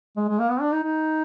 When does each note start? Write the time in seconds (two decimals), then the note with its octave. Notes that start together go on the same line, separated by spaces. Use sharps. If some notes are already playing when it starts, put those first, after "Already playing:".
0.16 G#3
0.28 G#3
0.39 A#3
0.50 B3
0.61 D4
0.72 D#4
0.83 D#4